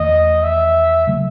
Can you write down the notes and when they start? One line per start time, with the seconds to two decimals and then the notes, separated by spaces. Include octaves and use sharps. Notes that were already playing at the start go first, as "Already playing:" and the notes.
Already playing: E2 D#3 A3 D#5
0.43 E5
1.07 C#3 F#3 A3